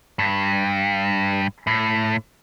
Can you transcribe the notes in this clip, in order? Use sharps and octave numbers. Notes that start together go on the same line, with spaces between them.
G2
A2